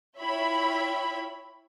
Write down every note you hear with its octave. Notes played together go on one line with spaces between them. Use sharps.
E4 F4 C#5 E5 G5 B5